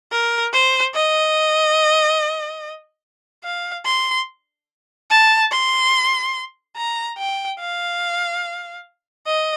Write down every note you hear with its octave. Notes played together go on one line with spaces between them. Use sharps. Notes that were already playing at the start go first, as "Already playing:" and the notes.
A#4
C5
D#5
F5
C6
A5
C6
A#5
G5
F5
D#5